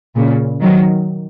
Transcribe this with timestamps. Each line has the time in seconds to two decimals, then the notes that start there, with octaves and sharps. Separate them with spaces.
0.16 A#2 C#3
0.61 D#3 F#3